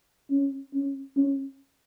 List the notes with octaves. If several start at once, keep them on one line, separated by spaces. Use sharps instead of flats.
C#4
C#4
C#4